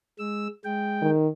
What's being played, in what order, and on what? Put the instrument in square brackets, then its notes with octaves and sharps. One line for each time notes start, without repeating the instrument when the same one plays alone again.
[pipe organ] G#3 E6
G#3 G5
[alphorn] D#3